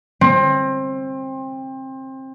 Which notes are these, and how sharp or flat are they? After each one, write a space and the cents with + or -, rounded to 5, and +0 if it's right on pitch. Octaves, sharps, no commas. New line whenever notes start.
C4 +25